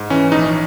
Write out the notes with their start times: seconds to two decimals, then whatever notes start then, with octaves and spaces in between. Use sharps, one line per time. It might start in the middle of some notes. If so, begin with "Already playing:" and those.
Already playing: G#2
0.10 E3 C#4
0.32 A#1 D#4